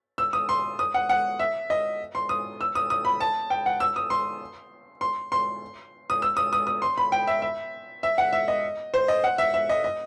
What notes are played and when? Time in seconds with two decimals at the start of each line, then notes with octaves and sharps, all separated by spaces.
0.18 E6
0.33 D#6
0.49 C6
0.79 D#6
0.94 F#5
1.09 F#5
1.39 E5
1.70 D#5
2.15 C6
2.29 D#6
2.61 E6
2.75 D#6
2.90 D#6
3.05 B5
3.20 A5
3.50 G5
3.66 F#5
3.80 E6
3.96 D#6
4.10 C6
5.01 C6
5.32 C6
6.10 D#6
6.22 E6
6.37 D#6
6.53 D#6
6.67 D#6
6.82 C6
6.98 B5
7.12 G5
7.27 E5
7.42 E5
8.03 E5
8.18 F#5
8.33 E5
8.48 D#5
8.94 C5
9.08 D#5
9.24 F#5
9.38 E5
9.54 E5
9.69 D#5
9.84 D#5